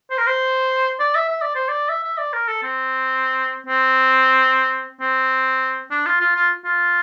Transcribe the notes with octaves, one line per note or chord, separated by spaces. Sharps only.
C5
A#4
C5
D5
E5
E5
D5
C5
D5
E5
E5
D5
A#4
A4
C4
C4
C4
D4
F4
F4
F4
F4